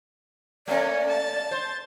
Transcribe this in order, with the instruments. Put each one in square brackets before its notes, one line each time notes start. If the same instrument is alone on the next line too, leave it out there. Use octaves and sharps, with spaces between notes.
[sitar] A3 A#3 [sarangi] C#4 [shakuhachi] D5
[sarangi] A5
[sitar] C5